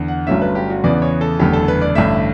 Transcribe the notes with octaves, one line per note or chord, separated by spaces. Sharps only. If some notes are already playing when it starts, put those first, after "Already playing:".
Already playing: E2 D3
F#5
G1 G2 F#3 A3 C#4 E5
B4
G4
F#4
E2 C#3 E3 B3 D5
C#5
A4
F#1 E2 D3 A3 G4
A4
B4
D5
A1 G2 D3 A3 E5